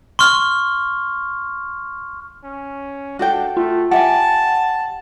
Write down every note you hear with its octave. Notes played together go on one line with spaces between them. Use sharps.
C6 C#6 F6
C#4
D4 F#4 A4 G5
A3 F4
G4 E5 F#5 G#5 A5